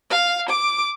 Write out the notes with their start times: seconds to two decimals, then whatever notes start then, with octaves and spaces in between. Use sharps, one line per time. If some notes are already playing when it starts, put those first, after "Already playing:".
0.10 F5
0.49 D6